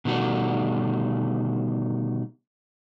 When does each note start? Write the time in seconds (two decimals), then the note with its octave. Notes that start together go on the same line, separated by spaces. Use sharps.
0.05 B2 D3 D#3 G3 A3 F#4